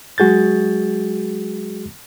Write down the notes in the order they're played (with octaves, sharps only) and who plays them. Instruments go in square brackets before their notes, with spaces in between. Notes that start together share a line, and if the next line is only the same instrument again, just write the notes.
[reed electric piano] F#3 G#3 F#4 G#4 G6 A6